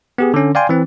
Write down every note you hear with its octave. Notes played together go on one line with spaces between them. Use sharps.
B3 G4 G#4
D3 C#4
D5 F5 G5 G#5 C6
E3 C4